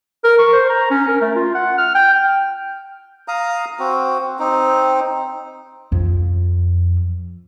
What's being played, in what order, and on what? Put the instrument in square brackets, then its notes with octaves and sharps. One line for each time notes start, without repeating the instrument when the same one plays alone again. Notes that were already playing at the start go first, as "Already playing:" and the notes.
[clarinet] A#4
C#6
C5
A#5
C#4
A#4
A3
F4
F#5
F6
G5
[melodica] F5 A#5 D#6
C4 F#4
C4 D#4
[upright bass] F2